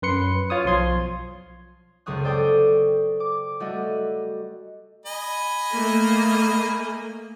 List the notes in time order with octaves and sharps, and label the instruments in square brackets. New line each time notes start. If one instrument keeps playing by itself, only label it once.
[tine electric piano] F#2 B4 C6 C#7
F4 C#5 D#6
B1 F3 C6 G#6
[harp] F#1 C#2 C4 C#6 D#6 F#6
A4 C5 D5 G5 C#6 D#6
D6
G3 A3 F#4 D#5 F#5
[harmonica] D#5 G#5 B5
[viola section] A3 A#3